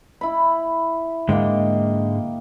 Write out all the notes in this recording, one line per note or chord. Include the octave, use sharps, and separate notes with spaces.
E4 B5
G#2 D3 G#3 A#3 D#5 G5